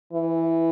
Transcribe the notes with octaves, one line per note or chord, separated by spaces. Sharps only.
E3